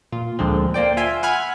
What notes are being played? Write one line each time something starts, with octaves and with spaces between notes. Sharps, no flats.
A#2 F4
D2 A#2 D3 F3 G#3 C4
A#3 C5 D5 G5
F4 E5 G#5 C6
F#5 G#5 B5 F6 G#6